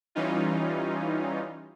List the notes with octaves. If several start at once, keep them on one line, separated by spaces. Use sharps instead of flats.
E3 G3 C#4 D#4 F4